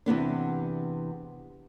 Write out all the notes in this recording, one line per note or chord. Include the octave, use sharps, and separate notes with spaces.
E2 C3 B3 D4